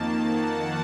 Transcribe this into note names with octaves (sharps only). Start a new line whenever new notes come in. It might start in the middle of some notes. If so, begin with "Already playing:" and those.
Already playing: F2 D#3 A#3 A5
F#5